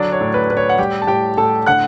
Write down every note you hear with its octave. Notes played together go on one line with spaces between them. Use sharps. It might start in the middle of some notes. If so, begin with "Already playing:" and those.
Already playing: D3 F#3 D4 D5
C#5
A2
B4
A2 B4
C#5
F#5
G3 G4 G5
A5
A2 G4 G5
A2 A4 A5
D3 F#5 F#6